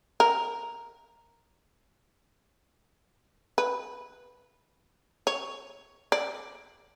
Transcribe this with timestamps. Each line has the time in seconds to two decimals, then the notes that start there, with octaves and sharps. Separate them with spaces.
0.20 A#4
3.58 B4
5.27 C#5
6.12 D5